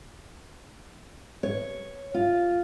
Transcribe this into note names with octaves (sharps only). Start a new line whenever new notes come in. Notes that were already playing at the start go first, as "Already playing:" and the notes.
C#5
F4